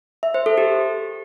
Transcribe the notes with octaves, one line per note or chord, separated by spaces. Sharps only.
E5
C5
A4
G4